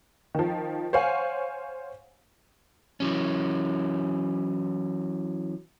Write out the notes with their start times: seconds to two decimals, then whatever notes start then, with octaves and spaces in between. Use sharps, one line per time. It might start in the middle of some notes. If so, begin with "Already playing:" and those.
0.35 D#3 F3
0.93 C5 C#5 F5 F#5 G#5
3.00 E3 F#3 C#4